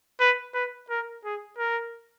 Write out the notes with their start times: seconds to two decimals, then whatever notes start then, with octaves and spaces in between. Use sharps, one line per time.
0.20 B4
0.54 B4
0.90 A#4
1.25 G#4
1.58 A#4